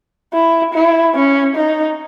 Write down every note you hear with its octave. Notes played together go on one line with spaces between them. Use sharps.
E4
E4
C#4
D#4